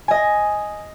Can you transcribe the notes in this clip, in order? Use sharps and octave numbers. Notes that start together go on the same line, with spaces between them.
D#5 G#5